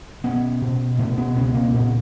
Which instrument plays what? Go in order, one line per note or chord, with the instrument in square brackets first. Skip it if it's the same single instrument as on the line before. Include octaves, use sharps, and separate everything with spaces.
[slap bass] B2 B3 C#4
B2
B2 A3 B3
B3 C#4
C#2 B3 C#4
A#3 C4
A#2 B3 C#4